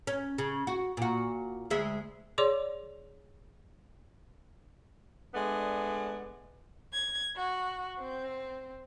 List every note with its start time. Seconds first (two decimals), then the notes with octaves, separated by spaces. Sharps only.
0.07 C#4
0.38 C#3
0.67 F#4
0.97 A#2 F#4
1.70 D2 G#3 E5
2.38 G#4 C#5 D5 C6 D6
5.35 G#3 A3 B3 D4 D5
6.93 G#6
7.36 F#4
7.98 C4